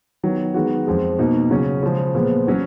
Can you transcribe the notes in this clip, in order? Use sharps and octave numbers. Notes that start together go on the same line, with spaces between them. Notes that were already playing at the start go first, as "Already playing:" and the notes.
D#3 F#3 B3
D#3 G#3 B3 F#4
F2 F3 G#3
B2 A#3 D#4 F#4
C#3 F#3 C#4
C#3 F3 G#3
A#2 F3 G#3 B3
F#3 C#4 F#4